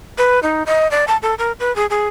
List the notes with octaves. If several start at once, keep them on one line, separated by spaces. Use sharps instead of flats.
B4
D#4
D#5
D5
A5
A4
A#4
B4
G#4
G#4